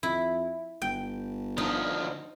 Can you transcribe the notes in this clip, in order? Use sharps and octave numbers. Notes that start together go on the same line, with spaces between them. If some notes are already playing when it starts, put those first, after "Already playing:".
F2 E4
G1 G5
D2 F3 D#4